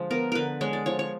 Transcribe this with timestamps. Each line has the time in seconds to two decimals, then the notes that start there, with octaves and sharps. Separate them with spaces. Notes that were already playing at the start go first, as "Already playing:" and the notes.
Already playing: D3 F3 G#3
0.11 B3 A#4
0.32 D3 A#4 B4
0.61 G#3 C#5
0.73 D5
0.86 F3 C#5
0.99 C#5